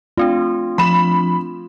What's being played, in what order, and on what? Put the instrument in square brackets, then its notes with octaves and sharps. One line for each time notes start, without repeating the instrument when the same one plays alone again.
[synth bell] A3 C4 D4 [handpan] F4
[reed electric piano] F3 [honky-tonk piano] B5 E7